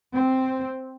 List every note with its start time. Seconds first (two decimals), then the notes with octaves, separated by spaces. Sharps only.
0.13 C4